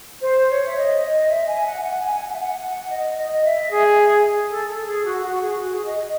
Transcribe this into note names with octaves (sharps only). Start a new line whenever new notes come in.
C5
C#5
E5
D#5
E5
G#5
F#5
F#5
G#5
G#5
F#5
E5
F#5
D#5
D#5
E5
G#4
A4
A4
G#4
F#4
F#4
G#4
F#4
G#4
D#5
D#5